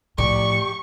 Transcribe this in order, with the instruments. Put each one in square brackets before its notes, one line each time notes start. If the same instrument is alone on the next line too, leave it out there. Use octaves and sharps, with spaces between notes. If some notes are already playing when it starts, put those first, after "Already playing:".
[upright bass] A2 F3 [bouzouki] G4 D5 [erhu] C#6